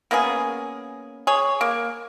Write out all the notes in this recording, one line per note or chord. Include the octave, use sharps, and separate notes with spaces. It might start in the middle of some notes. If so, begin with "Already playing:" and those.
A#3 B3 C#4 G#4
G#4 C#5
A#3